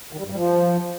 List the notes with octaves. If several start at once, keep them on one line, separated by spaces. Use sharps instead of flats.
D#3
G3
G2
G3
F3